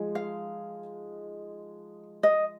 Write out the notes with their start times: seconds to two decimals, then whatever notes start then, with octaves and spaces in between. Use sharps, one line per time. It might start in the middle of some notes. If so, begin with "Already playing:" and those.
Already playing: F3 G#3 D#4 G#4
0.15 F5
2.23 D#5